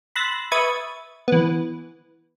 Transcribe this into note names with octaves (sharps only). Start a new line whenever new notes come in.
B5 C6 E6 F#6 A6 A#6
B4 E5 C#6 D#6 G#6 A6
E3 B3